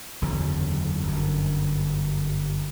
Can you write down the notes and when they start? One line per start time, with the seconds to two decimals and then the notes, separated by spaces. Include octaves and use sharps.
0.22 F#1 E2 D3 F#3
1.03 G1 F#2